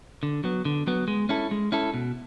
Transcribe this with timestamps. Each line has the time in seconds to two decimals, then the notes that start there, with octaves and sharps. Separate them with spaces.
0.23 D3
0.44 F#3 B3
0.65 D3
0.87 F#3 B3
1.08 G#3
1.29 C#4 E4 A4
1.51 G#3
1.72 C#4 E4 A4
1.94 B2